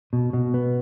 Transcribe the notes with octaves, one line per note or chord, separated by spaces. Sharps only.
B2
B2
B3